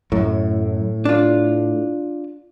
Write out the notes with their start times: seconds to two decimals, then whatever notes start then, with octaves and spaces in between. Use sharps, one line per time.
0.12 F#2 A2
1.05 D4 F4